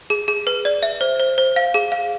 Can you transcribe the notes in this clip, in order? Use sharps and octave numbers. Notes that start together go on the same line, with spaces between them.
G#4
G#4
B4
D5
E5
C5
C5
C5
F5
G#4
F5